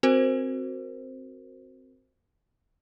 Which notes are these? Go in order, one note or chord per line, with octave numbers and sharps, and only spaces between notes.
C4 F#4 A#4 C5